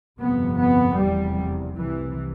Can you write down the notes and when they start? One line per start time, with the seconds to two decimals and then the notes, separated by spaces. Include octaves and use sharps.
0.19 G1 F2 C3 B3
0.58 B3
0.98 F1 E2 C3 G3
1.76 C2 C3 E3